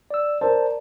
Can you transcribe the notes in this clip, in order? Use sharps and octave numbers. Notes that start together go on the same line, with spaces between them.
D5 E6
A#4 C5 D5 A5